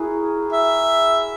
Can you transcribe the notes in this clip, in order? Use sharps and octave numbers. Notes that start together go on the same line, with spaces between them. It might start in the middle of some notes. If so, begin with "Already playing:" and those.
Already playing: E4 F#4 G#4 A#4
E5